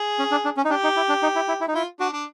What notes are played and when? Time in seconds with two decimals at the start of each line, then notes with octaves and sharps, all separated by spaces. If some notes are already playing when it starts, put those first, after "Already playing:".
Already playing: G#4
0.19 C#4
0.31 D4
0.45 D4
0.57 C#4
0.65 D#4
0.70 D4 G4
0.84 D#4
0.96 E4
1.09 D4
1.23 D#4
1.35 E4
1.48 E4
1.61 E4
1.68 D#4
1.74 E4 F4
2.00 D4 F#4
2.13 D4